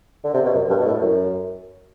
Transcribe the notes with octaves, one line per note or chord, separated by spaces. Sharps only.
D3
C3
B2
F#2
G2
B2
A2
F#2